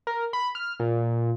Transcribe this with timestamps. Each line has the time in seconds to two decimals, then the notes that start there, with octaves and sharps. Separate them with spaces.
0.07 A#4
0.33 B5
0.55 F6
0.80 A#2